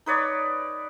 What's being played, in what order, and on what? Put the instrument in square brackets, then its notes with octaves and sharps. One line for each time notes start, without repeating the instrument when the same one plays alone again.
[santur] D#4 B4 C#5 D5